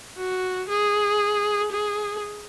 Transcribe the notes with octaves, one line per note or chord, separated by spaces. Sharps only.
F#4
G#4
G#4